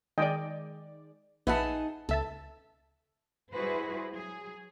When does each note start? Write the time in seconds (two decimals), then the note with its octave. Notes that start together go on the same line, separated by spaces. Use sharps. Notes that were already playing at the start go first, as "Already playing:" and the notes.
0.18 D#3 G#3 D5 D#5 G5
1.47 A#1 D#4 G#4 B4 E5 F#5 A5
2.09 C#2 A4 E5 A5
3.53 G3 E4 F#4 G#4 B4 C5
4.12 F#3 G#4